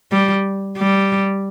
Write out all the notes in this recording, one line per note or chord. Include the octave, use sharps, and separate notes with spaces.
G3
G3